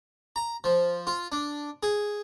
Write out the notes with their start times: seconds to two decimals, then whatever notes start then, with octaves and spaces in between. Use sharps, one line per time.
0.36 A#5
0.64 F3
1.07 F4
1.32 D4
1.83 G#4